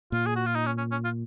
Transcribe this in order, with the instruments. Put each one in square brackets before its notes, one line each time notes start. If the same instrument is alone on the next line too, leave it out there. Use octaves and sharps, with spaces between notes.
[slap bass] A#2 [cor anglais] F4
[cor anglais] G#4
F#4
F4
D#4
C#4
C#4
C#4
F4